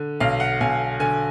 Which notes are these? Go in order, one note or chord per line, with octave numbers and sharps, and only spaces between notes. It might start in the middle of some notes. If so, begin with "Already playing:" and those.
Already playing: D3
B1 F5
F#5
B1 G#5
D3 G#5